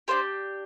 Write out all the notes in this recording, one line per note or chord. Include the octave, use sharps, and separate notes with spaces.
D4 G4 C5